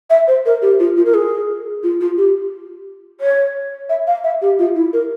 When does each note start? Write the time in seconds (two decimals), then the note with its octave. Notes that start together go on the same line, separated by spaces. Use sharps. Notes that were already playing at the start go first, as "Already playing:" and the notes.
0.10 E5
0.28 C5
0.46 A#4
0.62 G4
0.79 F4
0.97 F4
1.06 A#4
1.14 G#4
1.83 F4
2.01 F4
2.18 G4
3.21 C#5
3.89 E5
4.07 F5
4.24 E5
4.42 G4
4.59 F4
4.75 E4
4.93 A#4